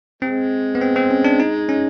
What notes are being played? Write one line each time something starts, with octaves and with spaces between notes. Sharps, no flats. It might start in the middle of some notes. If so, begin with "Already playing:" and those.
C3 G#3 C4
B3
C4
C4
C#4
D4
D#4
C#4